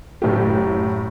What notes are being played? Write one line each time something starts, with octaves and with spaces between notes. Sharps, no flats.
F#1 A2 G4